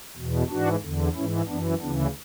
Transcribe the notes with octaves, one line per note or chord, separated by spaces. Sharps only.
E2 B2
G#2 E3 D4 F#4
E2 D3
G#2 E3 C#4 E4
F#2 E3 B3 D4
D2 C#3 E3 B3 D4